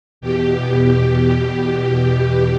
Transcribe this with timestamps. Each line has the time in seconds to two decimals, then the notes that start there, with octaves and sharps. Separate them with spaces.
0.21 E2 B2 G4